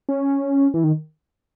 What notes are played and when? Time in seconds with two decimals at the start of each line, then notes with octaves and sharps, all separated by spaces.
0.09 C#4
0.74 E3
0.84 D#3